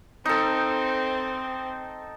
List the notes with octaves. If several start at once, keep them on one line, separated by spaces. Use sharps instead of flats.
C4 D#4 A4